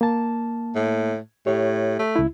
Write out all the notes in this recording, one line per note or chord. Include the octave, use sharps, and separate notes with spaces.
A#3 A5
A2
A2 G4 C#5
A3
C#2 E4